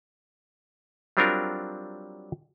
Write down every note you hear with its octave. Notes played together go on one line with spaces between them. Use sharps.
F#3 G3 C4 D4 F4 A#4